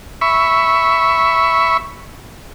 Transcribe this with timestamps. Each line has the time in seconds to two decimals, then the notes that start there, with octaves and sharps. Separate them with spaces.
0.21 E5 B5 C#6